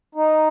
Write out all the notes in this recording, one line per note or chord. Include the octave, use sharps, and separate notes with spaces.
D#4